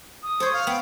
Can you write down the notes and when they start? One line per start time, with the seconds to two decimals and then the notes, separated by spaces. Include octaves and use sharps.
0.23 D#6
0.40 A4 C5 C#5
0.53 F5
0.67 B3 G5